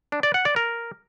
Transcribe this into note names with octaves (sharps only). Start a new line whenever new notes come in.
D4
D5
F#5
D5
A#4